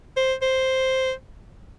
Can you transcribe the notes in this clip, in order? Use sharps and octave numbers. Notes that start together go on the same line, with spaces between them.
C5
C5